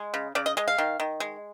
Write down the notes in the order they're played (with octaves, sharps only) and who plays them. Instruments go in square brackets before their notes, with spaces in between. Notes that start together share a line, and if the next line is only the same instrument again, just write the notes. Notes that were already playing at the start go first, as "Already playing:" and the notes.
Already playing: [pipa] G#3
C#3
C#3 D5
D#5
G#3 D#5
F5
D#3
D#3
G#3